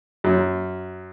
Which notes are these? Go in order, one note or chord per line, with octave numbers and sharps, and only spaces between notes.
F#2